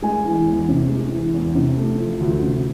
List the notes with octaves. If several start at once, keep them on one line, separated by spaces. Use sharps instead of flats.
G#3 G#5
E3
E2
C3
G#3
E3
E2
C3
A3
F3
D2
C3